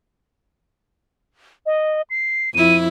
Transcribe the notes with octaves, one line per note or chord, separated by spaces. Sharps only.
D#5
C7
F2 E4 D#7